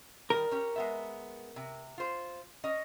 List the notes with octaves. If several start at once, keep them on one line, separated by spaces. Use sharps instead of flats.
D#3 G3 A#4
C#4 G4
G#3 B3 E5
C3
F4 C5
C#4 D#5